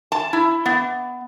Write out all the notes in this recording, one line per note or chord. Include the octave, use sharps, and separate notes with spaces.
A5
E4
B3